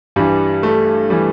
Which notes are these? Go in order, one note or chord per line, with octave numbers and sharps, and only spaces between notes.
G2 E3 G3
A3
E3 G3